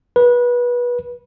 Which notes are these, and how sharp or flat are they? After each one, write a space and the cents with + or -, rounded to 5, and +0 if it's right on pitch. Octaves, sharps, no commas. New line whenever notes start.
B4 -25